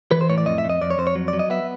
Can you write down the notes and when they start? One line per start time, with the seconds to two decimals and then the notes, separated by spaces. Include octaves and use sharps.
0.11 E3 B4
0.21 C5
0.30 A2 C#5
0.38 D5
0.46 F2 D#5
0.58 E5
0.65 F2 D#5
0.81 F2 D5
0.90 C#5
0.98 F2 C5
1.07 C#5
1.15 F#3
1.28 D5
1.33 F#3
1.39 D#5
1.50 B3 E5